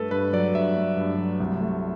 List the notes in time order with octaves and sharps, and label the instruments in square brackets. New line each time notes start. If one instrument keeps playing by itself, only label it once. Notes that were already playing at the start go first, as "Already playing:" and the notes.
Already playing: [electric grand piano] G2 A3 A4 B4
G2 B4
F#3 D5
G2 E5
A3
G2
F#3
C2
A3